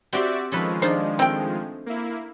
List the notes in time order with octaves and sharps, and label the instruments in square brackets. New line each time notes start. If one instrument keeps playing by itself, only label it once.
[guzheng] C4 G4 C6 [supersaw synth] F#4 D5 E5
[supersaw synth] D#3 F3 G#3 [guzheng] C#4 A4 B4
[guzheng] D4 D#4 F4 [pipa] C5
[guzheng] A3 [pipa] C4 G5
[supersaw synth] A#3 E4